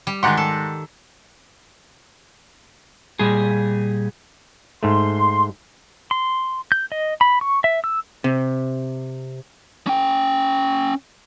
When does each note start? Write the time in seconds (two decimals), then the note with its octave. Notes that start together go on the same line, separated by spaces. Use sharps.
0.07 G3
0.23 G#2 D#3 G4 F#5 C6
0.37 A4
3.19 A#2 G3 G#4
4.83 G#2 A3 C6
6.11 C6
6.72 G6
6.92 D#5
7.21 B5
7.41 C#6
7.64 E5
7.84 E6
8.24 C3
9.87 C#4 G5